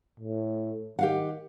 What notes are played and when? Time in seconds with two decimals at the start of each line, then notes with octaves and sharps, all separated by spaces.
0.20 A2
0.99 D#3 G4 F5 F#5